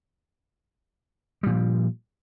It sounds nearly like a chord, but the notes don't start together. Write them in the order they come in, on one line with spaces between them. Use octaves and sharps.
G3 A#2 F3